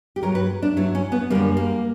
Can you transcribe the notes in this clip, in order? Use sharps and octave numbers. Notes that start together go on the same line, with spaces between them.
G4
G2 F#3 A#4
B4
D4
G2 F#3 E4
C#4
B3
F#2 D3 G3 A#3
A#3